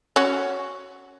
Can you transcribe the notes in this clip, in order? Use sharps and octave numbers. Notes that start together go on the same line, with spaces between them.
C#4 F#4